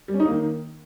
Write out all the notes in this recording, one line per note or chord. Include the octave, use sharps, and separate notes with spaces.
G3
C#4
D#4
A#3
D#3